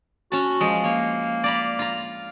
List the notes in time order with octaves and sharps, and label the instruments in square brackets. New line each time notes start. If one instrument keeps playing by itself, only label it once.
[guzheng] C#4 A5 [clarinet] F#4
[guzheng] F3 G#3
[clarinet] A#3 [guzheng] C#5
[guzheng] D5 A#5 B5
F4 A#5